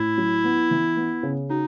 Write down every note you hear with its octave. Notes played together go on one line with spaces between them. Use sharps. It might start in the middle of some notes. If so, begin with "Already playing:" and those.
Already playing: A2 E4
F#3
B3
E3
B3
C#3
D#4 F#4